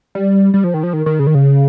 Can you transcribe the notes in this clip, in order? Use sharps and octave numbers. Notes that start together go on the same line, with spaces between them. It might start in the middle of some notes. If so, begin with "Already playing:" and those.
G3
G3
F3
D#3
F3
D#3
D#3
C#3
D#3
C#3